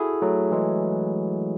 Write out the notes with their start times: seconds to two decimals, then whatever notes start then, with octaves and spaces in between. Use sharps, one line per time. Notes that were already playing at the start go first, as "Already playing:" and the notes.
Already playing: E4 F#4 G#4 A4
0.22 F#3 A3
0.52 E3 G#3